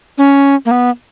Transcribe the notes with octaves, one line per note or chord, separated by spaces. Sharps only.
C#4
A#3
B3